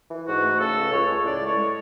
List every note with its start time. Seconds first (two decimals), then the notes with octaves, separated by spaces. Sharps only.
0.10 E3
0.26 G#2 F#4
0.43 A3
0.59 C#3 A4
0.75 C#2
0.91 C#2 C#5
1.07 C#2
1.24 A2 D5
1.41 G#3
1.46 C#5
1.56 G#3